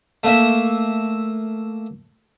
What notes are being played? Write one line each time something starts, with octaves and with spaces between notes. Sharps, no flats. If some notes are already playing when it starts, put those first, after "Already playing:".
A3 A#3 E5